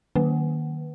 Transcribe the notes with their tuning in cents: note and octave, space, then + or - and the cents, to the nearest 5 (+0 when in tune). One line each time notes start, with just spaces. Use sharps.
D#3 -20 A#3 +0